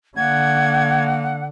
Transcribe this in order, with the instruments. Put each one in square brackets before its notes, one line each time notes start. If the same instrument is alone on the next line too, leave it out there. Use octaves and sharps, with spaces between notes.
[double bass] D3 [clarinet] A#3 [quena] F#5 [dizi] G#6